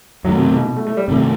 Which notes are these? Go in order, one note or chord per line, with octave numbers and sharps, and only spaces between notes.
F#2 D#3 F#3 A3
C3
C3
B2
B2
A3
A3
G3
G2 C3 D#3 A3